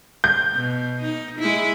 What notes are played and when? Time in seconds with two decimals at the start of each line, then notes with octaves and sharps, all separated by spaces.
0.24 G6
0.55 B2
1.02 D#4
1.39 G#3 E4